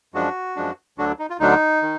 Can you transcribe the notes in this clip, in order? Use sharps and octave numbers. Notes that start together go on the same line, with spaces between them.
F#2 F3 G#3 D4 F#4
F#2 F3 G#3 D4
D2 D3 F#3 D4 F#4
D#4
F4
D2 D3 F#3 D4 D#4
D#3